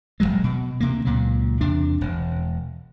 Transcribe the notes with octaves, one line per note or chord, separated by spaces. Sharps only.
D#1 D#2 F#3 G#3
B2
D2 C3 A#3
C#2 A#2 F#3
E2 C3 D4
E1